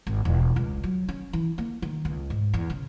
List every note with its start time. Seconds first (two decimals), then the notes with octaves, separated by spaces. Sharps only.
0.07 G#1
0.25 E1
0.56 C#2
0.83 F#3
1.08 C#4
1.33 E3
1.58 A#3
1.82 D#3
2.05 C#2
2.30 G#2
2.54 E2
2.70 C#3